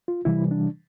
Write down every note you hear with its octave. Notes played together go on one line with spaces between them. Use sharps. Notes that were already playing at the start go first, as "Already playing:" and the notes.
F4
C3 E3 G3 E4
D4